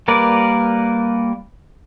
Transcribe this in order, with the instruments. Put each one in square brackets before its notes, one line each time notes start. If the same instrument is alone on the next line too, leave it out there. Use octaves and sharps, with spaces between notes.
[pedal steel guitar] G3 A#3 A#4 B4 D5